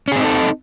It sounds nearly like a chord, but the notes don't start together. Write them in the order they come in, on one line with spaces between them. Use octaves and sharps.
C#4 G#4 C4 D#4 A4